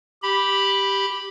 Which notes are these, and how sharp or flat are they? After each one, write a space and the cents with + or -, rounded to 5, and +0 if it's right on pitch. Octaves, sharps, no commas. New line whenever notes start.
G4 +0 B5 +0